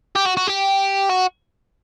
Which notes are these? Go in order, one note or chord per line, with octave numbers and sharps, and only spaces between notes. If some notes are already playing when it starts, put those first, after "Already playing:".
G4
F#4
F#4
G4
F#4